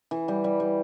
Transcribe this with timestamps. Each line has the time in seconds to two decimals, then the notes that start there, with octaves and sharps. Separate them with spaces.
0.11 E3
0.28 G3
0.44 G3
0.60 G3